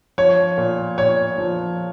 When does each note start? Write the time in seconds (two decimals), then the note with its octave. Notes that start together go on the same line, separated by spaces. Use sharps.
0.18 F3 C#5
0.58 A#2
0.98 A#2 C#5
1.38 F3